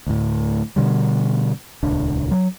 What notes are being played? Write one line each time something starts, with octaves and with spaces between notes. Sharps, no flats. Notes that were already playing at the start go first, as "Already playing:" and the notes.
D2 A2
B2 D3 G3
D#1 C#2 D4
F#3